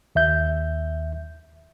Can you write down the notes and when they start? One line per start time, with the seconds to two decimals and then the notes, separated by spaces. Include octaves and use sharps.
0.15 D#2 E5 G6